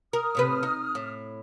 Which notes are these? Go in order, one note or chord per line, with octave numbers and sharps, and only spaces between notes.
A#4 D#6 F6
A2 C3 B4
D#4
A2